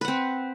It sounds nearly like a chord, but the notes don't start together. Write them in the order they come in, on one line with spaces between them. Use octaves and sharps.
B4 F#5 C4